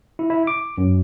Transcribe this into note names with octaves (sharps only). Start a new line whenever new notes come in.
E4
E4
D6
F#2